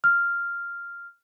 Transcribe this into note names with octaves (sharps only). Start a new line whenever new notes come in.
F6